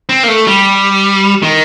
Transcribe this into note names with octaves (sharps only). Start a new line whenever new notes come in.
C4
A#3
A3
G3
D#3